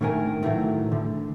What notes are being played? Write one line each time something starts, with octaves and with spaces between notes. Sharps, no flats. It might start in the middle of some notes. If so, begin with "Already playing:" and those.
A2 D3 D#3 A3 A#4 G#5
A2 D#3 E3 F#3 A3
D2 D3